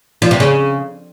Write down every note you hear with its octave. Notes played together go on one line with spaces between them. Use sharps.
F3
C3
C#3